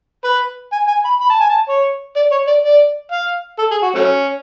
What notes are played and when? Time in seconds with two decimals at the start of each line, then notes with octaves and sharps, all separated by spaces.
0.24 B4
0.72 G#5
0.88 G#5
1.05 B5
1.21 B5
1.30 A5
1.41 G#5
1.50 A5
1.69 C#5
2.16 D5
2.31 C#5
2.47 D5
2.64 D5
3.12 F5
3.59 A4
3.71 G#4
3.83 F#4
3.95 F#3 A3 C#4